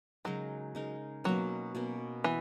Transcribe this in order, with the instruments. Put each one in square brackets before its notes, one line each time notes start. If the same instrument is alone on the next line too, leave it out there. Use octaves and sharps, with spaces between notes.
[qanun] C#3 G#3 D#4 A#4 [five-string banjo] F#3
[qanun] C#3 G#3 D#4 A#4
[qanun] B2 A#3 C#4 [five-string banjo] F#3
[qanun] B2 A#3 C#4
[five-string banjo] E3 [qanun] B3